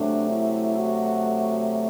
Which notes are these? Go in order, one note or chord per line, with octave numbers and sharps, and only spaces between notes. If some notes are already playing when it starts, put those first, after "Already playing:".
Already playing: C3 F#3 A3 D4
E4
F#4